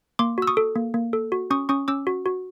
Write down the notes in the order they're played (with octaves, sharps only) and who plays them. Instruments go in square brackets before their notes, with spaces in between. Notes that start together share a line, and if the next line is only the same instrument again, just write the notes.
[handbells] A#3 C6 D6
F#4 E6
C#6 D#6
A4
A#3
A#3
A4
F#4
C#4 C#6 D#6
C#4 C#6 D#6
C#4 D6 E6
F#4
F#4